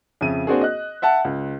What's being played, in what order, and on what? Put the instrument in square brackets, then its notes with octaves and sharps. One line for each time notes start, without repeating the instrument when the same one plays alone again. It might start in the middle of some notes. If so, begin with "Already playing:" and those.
[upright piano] F2 C#3 E5 D#7
A#3 C4 D4 F#4 G#4
D#5 F#6
E5 F#5 A5
C#2